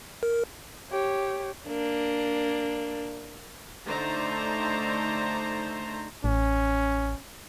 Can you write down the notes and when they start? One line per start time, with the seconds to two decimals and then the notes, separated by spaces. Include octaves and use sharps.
0.23 A#4
0.90 G4 C#5
1.66 A#3 D4
3.87 D3 A3 D#4 C5 A#5
6.24 A1 C#4